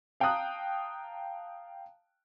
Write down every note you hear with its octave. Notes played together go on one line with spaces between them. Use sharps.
F5 G5 A5 A#5 D#6 F#6